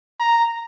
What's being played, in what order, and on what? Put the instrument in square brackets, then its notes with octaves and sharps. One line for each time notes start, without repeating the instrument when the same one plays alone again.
[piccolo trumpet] A#5